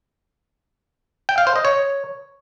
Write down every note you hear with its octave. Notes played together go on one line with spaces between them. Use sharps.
G5
F5
C5
D#5
C#5